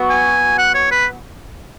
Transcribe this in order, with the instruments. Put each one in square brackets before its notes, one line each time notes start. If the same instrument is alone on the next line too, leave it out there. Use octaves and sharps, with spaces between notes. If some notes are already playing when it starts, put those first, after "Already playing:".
Already playing: [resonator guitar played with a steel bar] F#3 B3 F#4
[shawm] G#5
F#5
C#5
B4